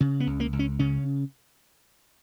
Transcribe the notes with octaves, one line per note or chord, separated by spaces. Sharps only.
C#3 C#4
B3
C#2
A#3
C#2
C#4
C#3 C#4